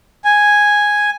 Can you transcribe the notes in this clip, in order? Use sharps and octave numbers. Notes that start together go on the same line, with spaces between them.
G#5